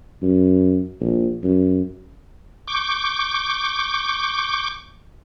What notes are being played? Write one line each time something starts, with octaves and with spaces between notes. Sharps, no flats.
F#2
A#1
F#2
C#6 D6 G6